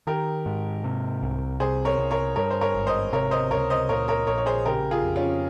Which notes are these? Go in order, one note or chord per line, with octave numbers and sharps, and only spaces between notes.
D#3 G4 A#4
G#2
C3
C2
C3 G#4 C5
A#4 C#5
C2
A#4 C#5
G2 A#4 C#5
C5
A#4 C#5
G#1
C5 D#5
C3 A#4 C#5
C5 D#5
C#2 A#4 C#5
C5 D#5
A#2 A#4 C#5
A#4 C#5
A#1 A#4 C#5
C#5
G#4 C5
C#3 G4 A#4
F4 G#4
F2
C#4 F4